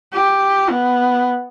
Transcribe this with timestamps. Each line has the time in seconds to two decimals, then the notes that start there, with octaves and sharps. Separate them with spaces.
0.13 G4
0.69 B3